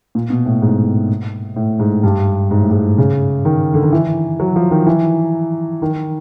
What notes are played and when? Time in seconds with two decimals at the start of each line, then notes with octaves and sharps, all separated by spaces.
0.15 A#2
0.30 B2
0.46 A2
0.62 G#2
1.56 A2
1.80 G#2
2.03 G2
2.51 G#2
2.60 A2
2.71 G#2
2.98 C#3
3.45 D#3
3.74 D3
3.83 D#3
3.92 E3
4.40 F#3
4.56 F3
4.71 D#3
4.86 E3
5.82 D#3